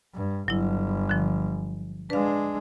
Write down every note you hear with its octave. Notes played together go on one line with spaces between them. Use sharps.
G2
G1 F#3 E4
D3 F3
G#3 D4 B4 F5